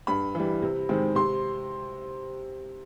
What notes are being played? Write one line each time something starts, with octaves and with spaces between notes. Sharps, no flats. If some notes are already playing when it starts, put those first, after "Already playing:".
G2 B5
E3 G3
C3
D#3 G#3 C4
C3 C6